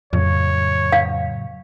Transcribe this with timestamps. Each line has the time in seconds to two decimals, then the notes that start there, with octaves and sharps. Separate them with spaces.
0.13 F2 A2 C#3 F#3 C#5
0.92 F5